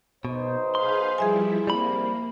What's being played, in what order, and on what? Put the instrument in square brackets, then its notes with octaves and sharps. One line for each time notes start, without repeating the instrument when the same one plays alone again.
[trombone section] B1 D#4 C5 [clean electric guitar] B2
[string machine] G#4 B4 F5 [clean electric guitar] C6
[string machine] F3 G3 E4 [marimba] G#4 E5 G#5
[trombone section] C2 C3 [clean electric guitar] G3 B5 [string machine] A#3